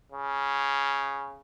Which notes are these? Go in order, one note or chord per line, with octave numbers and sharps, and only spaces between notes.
C#3